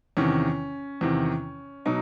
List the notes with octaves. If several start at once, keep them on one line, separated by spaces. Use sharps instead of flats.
E2 C3 D#3 C#4
E2 C3 D#3
B2 F#3 D#4